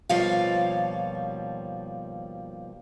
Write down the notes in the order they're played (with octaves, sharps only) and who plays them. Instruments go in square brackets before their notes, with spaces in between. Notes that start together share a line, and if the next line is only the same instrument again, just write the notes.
[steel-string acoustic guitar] D#2 B2 F3 G3 C#5 F5